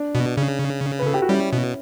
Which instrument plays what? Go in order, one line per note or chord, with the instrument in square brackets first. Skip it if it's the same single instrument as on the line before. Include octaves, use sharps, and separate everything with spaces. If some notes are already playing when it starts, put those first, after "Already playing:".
Already playing: [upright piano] D4
[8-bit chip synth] B2
C#3
[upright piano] B4
A4
G4
F#4
[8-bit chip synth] G3 [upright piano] C#4 E4
[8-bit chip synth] B2